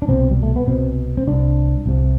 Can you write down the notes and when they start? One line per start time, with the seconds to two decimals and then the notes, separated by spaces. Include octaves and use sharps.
0.02 D4
0.08 C2 B2 C4
0.31 G3
0.43 A3
0.56 B3
0.67 C2 B2 C4
1.17 C4
1.27 C2 C3 D4
1.86 C2 C3